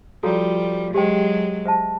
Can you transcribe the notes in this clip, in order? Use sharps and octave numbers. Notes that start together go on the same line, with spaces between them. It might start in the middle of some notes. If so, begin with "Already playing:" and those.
F3 G3 F#4 A4 C#5 F5 A#5
F#3 G#3 G4 C5 E5 G5
C5 E5 A5